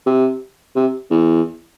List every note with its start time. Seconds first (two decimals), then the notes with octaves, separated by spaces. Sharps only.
0.06 C3
0.76 C3
1.10 E2